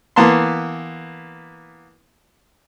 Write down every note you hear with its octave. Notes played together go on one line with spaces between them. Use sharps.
E3 A#3 B3 A5 C6